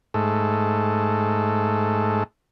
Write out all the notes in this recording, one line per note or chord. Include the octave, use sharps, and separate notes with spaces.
G#2 A3